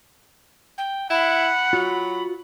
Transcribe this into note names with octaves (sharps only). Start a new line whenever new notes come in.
G5
E4 F#5 B5
F#3 F4 F#4